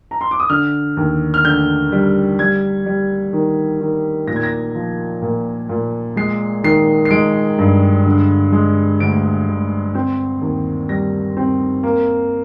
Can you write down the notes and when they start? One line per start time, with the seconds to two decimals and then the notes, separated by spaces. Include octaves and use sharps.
0.11 A#5
0.21 C6
0.31 D6
0.40 D#6
0.49 D3 F6
0.97 D#2
1.34 F6
1.45 D3 G6
1.92 G3
2.39 G3 G#6
2.86 G3
3.33 D#3
3.81 D#3
4.27 A#2 A#6
4.36 G#6
4.43 A#6
4.75 F3
5.22 A#2
5.69 A#2
6.16 G#3 C7
6.64 D#3 C7
7.05 C7
7.11 G#3 D7
7.58 G2
8.06 D3
8.52 G#3
9.00 D2 D7
9.47 D2
9.95 C4
10.41 D#2
10.89 G3 A#6
11.37 C4
11.83 A#3